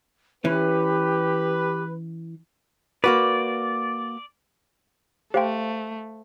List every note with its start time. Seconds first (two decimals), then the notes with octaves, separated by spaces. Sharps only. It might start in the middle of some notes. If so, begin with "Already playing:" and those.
0.45 E3 C#4 G4 B4
3.04 A#3 F#4 B4 D5
5.34 A3 G4 C5 F5 G5 C6